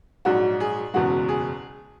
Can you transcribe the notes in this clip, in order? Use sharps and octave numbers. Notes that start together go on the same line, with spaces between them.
A#1 G#2 F#3 F#4
G#4
F#1 E2 B2 G#3 F#4
G#4